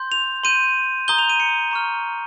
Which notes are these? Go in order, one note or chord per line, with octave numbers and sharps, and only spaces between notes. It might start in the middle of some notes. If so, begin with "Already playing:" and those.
Already playing: C6 G6
F7
C6 G6 D#7
A#5 D#6 G6 G7
F7
D#7
C#7
A#5 C#6 F6